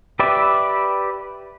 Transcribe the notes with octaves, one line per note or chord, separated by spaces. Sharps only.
G4 B4 D5 E5